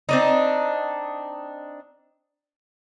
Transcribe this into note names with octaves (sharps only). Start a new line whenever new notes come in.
C4 D4 D#4